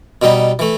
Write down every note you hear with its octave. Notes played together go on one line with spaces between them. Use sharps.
B2 G3 B3 D#4
E3 A3